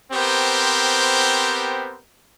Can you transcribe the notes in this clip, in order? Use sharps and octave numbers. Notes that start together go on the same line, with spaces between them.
B3 C4 G4 A#4 C5